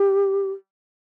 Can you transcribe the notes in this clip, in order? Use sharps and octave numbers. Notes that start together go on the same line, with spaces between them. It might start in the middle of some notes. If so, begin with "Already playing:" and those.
Already playing: G4